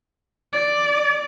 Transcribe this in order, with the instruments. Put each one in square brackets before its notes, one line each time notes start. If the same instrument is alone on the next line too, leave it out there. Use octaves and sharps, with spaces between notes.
[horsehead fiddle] D5